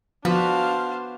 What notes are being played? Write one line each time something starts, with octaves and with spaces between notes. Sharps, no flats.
F3 B3 D4 F#4 B4 C5 F5 A5